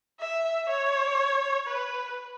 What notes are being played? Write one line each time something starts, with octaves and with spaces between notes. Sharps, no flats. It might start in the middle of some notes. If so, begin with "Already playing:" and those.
E5
C#5
B4